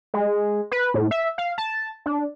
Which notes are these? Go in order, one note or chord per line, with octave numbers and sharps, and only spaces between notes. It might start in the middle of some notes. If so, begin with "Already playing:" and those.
G#3
B4
A2
E5
F5
A5
D4